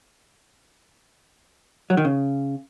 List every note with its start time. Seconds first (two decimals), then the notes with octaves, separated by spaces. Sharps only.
1.90 F#3
1.97 D#3
2.05 C#3